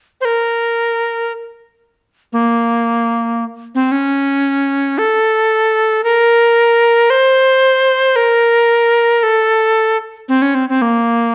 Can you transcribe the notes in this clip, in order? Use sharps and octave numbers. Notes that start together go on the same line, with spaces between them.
C5
A#4
A#3
C4
C#4
A4
A#4
C5
A#4
A4
C4
C#4
C4
C4
A#3